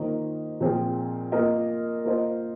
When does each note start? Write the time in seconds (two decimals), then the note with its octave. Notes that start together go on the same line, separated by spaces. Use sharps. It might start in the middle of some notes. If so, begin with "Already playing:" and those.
Already playing: D#3 A#3 F4 C5 D#5
0.61 A#2 F3 C4 F4 G#4
1.32 A#3 F4 A#4 D#5
2.05 A#3 F4 C5 D#5